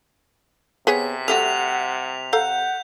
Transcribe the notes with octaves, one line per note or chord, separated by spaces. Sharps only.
C3 B3 G#4 C#5 B6
G3 A3 F#4 F#5 F7
A4 F5 F#5 A#5 G6